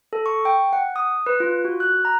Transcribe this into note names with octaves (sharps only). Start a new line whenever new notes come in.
A4
C#6
G5
F#5
D#6
B4
F4
F#4
F#6
A#5